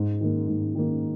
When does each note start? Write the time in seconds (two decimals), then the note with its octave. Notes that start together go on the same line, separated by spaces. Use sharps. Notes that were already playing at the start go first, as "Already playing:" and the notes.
Already playing: G#2
0.21 D#3 A#3
0.47 G#2
0.75 D#3 A#3